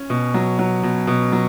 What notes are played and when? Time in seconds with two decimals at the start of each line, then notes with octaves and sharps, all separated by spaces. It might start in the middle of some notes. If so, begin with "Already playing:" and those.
Already playing: C#4
0.10 B2
0.34 F#3
0.59 F#3
0.83 B2
1.07 B2
1.32 F#3